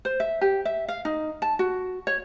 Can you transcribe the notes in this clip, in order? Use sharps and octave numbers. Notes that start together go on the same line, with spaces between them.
C5
E5
G4
E5
F5
D#4
A5
F#4
C#5